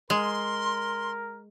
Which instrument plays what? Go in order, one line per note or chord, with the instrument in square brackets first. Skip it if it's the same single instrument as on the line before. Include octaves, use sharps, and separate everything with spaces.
[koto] G#3 [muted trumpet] A#4 [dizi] C6